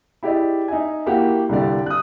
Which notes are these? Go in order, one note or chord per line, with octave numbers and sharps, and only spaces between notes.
E4 G4 G#4 D5 D#5
D#4 E5 G#5
A#3 E4 F#4 G4 F#5
C2 G2 D3 C4 G4 D5
D#6 F#6